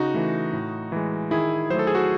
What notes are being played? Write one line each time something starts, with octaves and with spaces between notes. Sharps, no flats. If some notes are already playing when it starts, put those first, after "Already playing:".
Already playing: C#3 D#4 F#4
E3 A3
A2
E3 G#3
D#3 E4 G#4
F#3 A3 A4 C5
G#4
F#4 A4